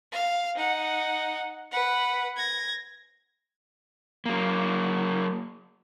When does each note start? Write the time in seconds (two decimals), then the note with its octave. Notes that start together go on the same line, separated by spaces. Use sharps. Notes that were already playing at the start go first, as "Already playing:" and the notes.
0.12 F5
0.56 D#4 F#5
1.71 B4 F#5
2.36 G#6 A#6
4.26 F#3 A#3